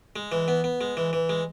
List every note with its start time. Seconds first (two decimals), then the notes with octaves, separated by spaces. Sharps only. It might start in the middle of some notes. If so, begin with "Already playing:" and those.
0.16 G#3
0.32 E3
0.48 B3
0.64 B3
0.81 G#3
0.97 E3
1.13 E3
1.29 G#3